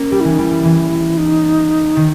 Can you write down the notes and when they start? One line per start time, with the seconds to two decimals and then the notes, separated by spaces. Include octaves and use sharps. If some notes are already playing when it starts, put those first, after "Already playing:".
Already playing: A#3 C#4
0.11 G3 G4
0.20 E3 E4
0.31 D#4
0.38 G3 E4
0.51 G3
0.65 E3
1.17 D#4
1.96 D#3